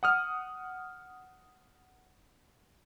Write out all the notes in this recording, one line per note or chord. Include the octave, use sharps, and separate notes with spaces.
F#5 D#6 F6